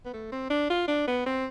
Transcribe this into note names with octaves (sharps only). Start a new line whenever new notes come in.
B3
A3
C4
D4
F4
D4
B3
C4